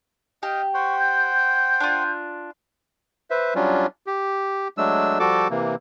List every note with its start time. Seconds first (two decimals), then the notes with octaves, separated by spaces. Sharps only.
0.43 G4 D#5 F5 G5
0.74 C5 F#5 G5 C#6
0.99 G6
1.80 D4 F4
3.30 B4 C5 E5
3.55 F#3 G3 C#4 D4 F4
4.07 G4
4.78 F#3 G#3 A3 D4 E6
5.20 F3 G3 F#4 A4 A5 D6
5.50 C3 E3 A#3